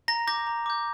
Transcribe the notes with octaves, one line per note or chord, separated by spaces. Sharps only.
A#5 A#6
D6 G6 A#6
A#5
D6 G6